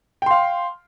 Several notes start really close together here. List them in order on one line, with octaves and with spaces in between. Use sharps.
G5 C6 F5